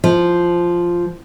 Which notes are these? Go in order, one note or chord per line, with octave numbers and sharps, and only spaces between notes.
F3